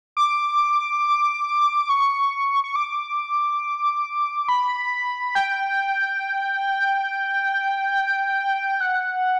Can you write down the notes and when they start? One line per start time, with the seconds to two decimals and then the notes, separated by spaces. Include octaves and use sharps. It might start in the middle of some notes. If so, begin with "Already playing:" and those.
0.17 D6
1.89 C#6
2.64 C#6
2.76 D6
4.48 B5
5.35 G5
8.81 F#5